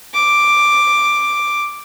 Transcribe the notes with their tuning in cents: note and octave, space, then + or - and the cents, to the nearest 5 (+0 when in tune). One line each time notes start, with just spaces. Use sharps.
D6 +5